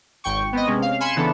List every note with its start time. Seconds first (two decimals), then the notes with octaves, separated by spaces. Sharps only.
0.24 G#1 G5 C#6
0.53 B3 C4 D#5
0.67 C3 G#3 C#4
0.82 F5
1.00 G#5 B5 C6 C#7 E7
1.16 C#3 E3 B3 D4 A4